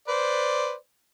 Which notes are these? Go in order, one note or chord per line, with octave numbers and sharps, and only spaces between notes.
B4 C5 D5